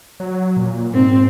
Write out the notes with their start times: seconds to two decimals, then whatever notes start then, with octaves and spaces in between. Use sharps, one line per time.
0.20 F#3
0.57 A#2
0.93 G#2 C4